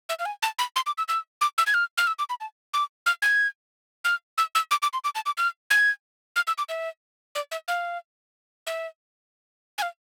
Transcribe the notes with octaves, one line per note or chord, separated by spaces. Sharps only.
E5
F5
G#5
A5
B5
C6
D6
E6
E6
D6
E6
G#6
F6
F6
E6
D6
B5
A5
D6
F6
G#6
F6
E6
E6
D6
D6
C6
D6
A5
D6
F6
G#6
F6
E6
D6
E5
D5
E5
F5
E5
G#5
F5